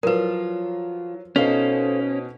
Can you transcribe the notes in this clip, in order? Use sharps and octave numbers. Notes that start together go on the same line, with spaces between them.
F3 F#3 F4 A#4 B4
B2 C#4 D#4 A4 C5 F5